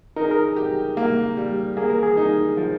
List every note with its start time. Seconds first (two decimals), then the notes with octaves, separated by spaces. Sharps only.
0.16 D#4 A#4
0.24 G#4
0.31 A#4
0.56 G4
0.97 A#3
1.37 G3
1.77 A#3 G#4
1.90 A#4
2.03 G#4
2.17 D#4
2.57 F3